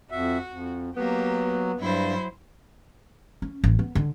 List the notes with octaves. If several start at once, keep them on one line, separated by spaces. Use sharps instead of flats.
F2 F#4 E5
F2
F#3 A#3 B3 G4
G2 F#3 E4 C5
C#4
A1
B3
D3